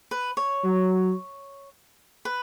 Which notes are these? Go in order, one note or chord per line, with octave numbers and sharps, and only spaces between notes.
B4
C#5
F#3
B4